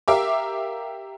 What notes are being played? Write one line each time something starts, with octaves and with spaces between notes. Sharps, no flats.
G4 A#4 E5 F5 D6